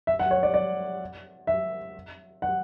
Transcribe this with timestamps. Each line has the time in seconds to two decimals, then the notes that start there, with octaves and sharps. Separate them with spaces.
0.07 E5
0.19 F#5
0.31 C#5
0.43 D5
0.54 D5
1.47 E5
2.42 F#5